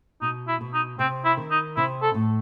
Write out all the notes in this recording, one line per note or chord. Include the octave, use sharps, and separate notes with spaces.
B2 D#4
E4
B2
D#4
C3 C4
E4
D#3
D#4
C3 E4
A4
A2